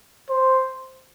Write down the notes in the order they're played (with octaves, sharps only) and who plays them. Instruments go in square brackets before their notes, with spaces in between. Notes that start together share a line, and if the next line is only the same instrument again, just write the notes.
[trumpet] C5